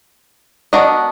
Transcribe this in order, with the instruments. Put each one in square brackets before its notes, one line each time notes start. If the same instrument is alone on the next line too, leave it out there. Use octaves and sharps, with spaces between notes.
[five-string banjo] B3 D4 F#4 A#4 D#5